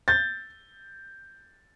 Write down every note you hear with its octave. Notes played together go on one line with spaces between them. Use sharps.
G6 A6